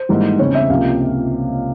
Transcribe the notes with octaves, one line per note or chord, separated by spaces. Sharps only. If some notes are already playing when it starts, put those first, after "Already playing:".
Already playing: C5
G#1 G#2 E3 G3 A#3
E2 C#3 G3 C4 C#5
E5
C#2 C3 F3 A#3 F5